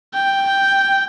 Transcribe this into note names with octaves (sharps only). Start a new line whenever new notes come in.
G5